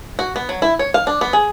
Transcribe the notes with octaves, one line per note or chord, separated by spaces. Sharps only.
F#4
B3
F#3
E4
C#5
F5
D4
B3
G#4